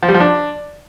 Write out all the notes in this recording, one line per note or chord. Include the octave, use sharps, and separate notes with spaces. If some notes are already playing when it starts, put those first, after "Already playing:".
F3
G3
F3
D4